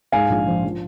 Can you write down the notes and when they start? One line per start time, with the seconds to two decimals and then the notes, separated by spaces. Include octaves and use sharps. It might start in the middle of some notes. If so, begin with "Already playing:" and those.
0.12 G#2 F5 G#5
0.30 A#1
0.47 F3
0.64 F3